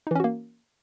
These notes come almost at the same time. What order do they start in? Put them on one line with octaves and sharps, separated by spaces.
D#4 E3 C#4 F#4 A#3